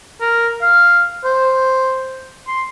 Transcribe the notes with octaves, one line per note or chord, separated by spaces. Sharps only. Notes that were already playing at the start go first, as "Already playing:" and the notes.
A#4
F5
C5
C6